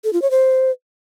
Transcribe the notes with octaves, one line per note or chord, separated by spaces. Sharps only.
A4
F4
C#5
C5